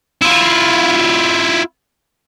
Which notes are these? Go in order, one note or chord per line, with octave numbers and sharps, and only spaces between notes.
E4 F4